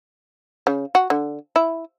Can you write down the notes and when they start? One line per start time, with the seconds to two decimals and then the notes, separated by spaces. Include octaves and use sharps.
0.67 C#3
0.95 F#4
1.10 D3
1.56 E4